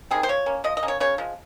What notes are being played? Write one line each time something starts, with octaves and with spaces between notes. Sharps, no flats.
D#3 G3 C4 G#4
C5
F3 C#5
A#3 C#4
F3 D#5
D#5
A#3 C#4
C#5
C#3 C#5
F3 G#3